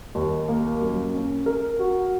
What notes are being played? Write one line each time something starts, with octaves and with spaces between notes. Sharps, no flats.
D#2
A#3
F#2
C#4
A#4
F#4